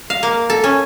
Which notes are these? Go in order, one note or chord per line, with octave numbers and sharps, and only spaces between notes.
F5
A#3
A4
C#4